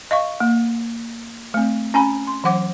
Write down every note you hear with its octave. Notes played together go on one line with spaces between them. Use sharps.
D#5 F5 C#6
A#3
A3 C4
C#4 G#5 A#5 B5
C6
E3 F#3 F#5 D6